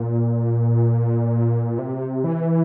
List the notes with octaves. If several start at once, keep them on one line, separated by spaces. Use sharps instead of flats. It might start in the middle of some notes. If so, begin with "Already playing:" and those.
Already playing: A#2
C3
E3